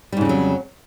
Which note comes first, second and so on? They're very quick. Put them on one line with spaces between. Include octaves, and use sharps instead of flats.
G3 G#2 C#3 F2 F#3